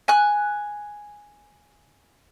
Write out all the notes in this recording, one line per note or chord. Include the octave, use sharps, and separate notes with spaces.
G#5 F#6